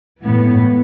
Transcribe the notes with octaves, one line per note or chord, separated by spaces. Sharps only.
A2 E3 B3